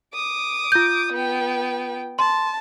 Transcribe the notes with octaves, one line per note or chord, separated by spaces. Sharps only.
D6 D#6
F4 G6
B3 G5
A5 C6